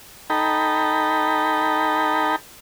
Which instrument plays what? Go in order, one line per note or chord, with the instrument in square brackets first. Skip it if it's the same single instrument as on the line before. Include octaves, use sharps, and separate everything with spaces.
[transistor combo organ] D#4 A4 G5 A#5 B5